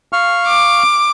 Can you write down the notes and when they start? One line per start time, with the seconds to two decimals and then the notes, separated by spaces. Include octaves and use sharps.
0.13 F5 C#6 F6
0.46 D6